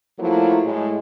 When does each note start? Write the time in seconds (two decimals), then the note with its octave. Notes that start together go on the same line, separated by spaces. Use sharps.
0.19 F3 F#3 A3 A#3 E4
0.65 A2 G#3